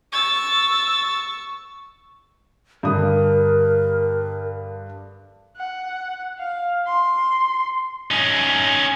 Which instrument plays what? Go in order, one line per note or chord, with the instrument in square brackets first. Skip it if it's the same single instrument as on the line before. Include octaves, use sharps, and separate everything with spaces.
[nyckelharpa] C#6 [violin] E6 A6
[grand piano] G2 D3 D#6 [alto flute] A#4
[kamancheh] F#5
F5
C6
[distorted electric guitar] C#4 D#4